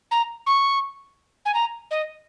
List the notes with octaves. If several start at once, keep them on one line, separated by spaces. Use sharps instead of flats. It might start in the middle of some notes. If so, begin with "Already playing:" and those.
A#5
C#6
G#5
A#5
D#5